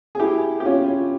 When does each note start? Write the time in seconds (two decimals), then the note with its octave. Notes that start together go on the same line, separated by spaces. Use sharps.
0.15 G#4
0.19 E4 G4
0.60 G4
0.65 C#4 F4